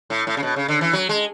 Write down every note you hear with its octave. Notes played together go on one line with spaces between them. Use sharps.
A2
A2
C#3
B2
C#3
D3
E3
F#3
G#3